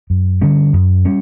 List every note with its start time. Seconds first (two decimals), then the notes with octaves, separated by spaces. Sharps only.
0.10 F#2
0.41 D3 G3 C#4
0.73 F#2
1.05 G3 C#4